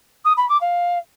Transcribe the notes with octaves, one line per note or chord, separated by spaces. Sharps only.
D#6
B5
D6
F5